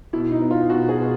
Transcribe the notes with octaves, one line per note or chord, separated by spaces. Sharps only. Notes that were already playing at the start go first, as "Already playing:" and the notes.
B2 E4
D#4
B3
F4
B2 F#4
G#4
B2